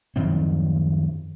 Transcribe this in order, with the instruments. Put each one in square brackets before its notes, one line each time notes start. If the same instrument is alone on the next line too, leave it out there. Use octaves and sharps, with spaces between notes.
[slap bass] F#2 D#3 F3 C4